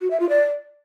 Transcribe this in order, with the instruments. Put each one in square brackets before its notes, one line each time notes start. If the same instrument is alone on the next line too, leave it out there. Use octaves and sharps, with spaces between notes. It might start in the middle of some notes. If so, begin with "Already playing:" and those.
[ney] F#4
E5
F4
D5